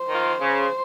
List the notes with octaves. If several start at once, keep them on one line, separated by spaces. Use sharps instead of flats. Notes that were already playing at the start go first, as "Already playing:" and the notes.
Already playing: C5
D#3 A#3 F4
C#3